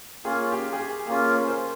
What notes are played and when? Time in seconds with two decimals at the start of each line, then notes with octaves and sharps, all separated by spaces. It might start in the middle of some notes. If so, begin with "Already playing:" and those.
0.25 A#3 C#4 F4 G#4
0.52 G4
0.73 G#4
0.80 G4
1.07 A#3 C#4 F4 G#4
1.28 A#4
1.48 C5